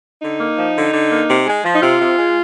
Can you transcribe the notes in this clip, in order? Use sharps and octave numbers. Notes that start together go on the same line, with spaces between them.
D3 D#4
A#3
F3
D3
D3
A#3
C3
G#3
F3
D#4
C3 F4
C3
G#3